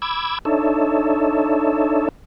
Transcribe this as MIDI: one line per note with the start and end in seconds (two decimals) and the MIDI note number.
0.02 0.39 83
0.02 0.39 86
0.02 0.39 88
0.02 0.39 92
0.45 2.09 62
0.45 2.09 63
0.45 2.09 69
0.45 2.09 73
0.45 2.09 76